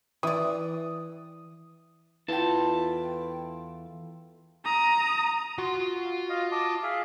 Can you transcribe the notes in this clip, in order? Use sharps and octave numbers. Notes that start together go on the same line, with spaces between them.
E3 D5 D#6
E2 E4 F4 A4 B4 G5 A5
A#5 D#6
F4 F#4 C6
D#5 F5
D#5 A5 D6
G#4 E5 F5